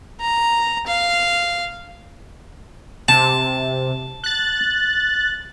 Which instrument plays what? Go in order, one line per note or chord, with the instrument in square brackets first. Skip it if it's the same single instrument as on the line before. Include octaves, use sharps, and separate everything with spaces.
[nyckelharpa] A#5
F5
[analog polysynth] C3 [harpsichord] A5
[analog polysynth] F#6 A6